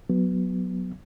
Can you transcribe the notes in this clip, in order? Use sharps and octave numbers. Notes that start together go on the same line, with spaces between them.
F#3 B3